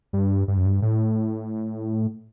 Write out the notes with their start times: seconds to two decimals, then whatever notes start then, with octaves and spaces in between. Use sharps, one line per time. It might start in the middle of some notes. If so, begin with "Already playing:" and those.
0.13 G2
0.48 G2
0.57 F#2
0.65 G2
0.82 A2